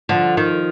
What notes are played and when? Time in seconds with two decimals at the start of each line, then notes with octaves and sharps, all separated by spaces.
0.09 D3 F3
0.37 D#3